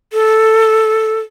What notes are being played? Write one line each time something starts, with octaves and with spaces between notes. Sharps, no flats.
A4